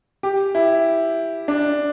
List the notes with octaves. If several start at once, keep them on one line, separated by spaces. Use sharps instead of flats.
G4
E4
D4